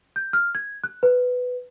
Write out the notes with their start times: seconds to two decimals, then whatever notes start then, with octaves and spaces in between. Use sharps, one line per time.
0.16 G6
0.33 F6
0.55 G#6
0.84 F#6
1.03 B4